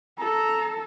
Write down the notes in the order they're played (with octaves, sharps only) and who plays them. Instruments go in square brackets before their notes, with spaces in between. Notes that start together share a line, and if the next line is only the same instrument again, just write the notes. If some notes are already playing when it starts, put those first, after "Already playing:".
[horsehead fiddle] A4 [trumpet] A#5